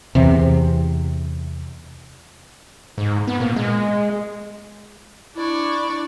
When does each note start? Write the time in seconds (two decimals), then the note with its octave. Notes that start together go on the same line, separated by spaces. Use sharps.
0.15 E2 C3
2.98 G#2
3.27 B3
3.40 A#2
3.56 G#3
5.35 D4 E4 D5 C#6